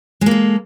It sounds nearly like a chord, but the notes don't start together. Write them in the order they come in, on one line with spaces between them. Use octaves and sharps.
G#3 A#3 A4